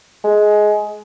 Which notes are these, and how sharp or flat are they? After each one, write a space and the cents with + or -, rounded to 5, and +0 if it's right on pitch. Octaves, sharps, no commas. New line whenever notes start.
G#3 +15